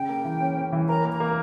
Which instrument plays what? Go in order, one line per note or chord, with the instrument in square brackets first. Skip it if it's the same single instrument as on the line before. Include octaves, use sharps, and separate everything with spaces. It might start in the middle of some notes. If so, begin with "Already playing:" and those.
Already playing: [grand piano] C#3 [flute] G5
[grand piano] A#3
E3
C#4
C#4
E3
[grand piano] A#4 [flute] A#5
[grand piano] A#3
[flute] A#5
[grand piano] A#3